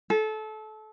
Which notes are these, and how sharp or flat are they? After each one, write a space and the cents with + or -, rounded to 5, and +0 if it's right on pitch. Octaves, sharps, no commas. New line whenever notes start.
A4 -25